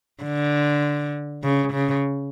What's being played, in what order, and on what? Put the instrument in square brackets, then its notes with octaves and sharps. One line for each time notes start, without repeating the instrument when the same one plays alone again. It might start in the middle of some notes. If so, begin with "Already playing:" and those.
[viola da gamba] D3
C#3
C#3